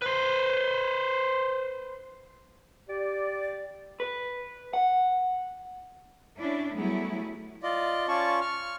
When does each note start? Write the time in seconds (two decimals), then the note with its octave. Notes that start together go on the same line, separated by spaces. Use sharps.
0.02 B4 C5
2.89 G4 D5
4.00 B4
4.73 F#5
6.37 C#4 D4 E4
6.76 F#3 G3 A3 B3 E4 G#4
7.63 F4 D5 D#5
8.08 C#4 F4 D5 A5 C#6
8.41 C#6 F6